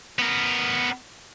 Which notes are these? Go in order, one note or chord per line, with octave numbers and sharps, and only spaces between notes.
B3 A#4